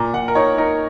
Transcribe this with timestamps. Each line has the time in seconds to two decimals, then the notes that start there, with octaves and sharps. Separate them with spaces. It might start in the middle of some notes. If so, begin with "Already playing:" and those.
Already playing: A#2 A#5
0.14 A#2 F#5
0.28 A#4
0.35 D#4 C#5
0.58 D#4 A#4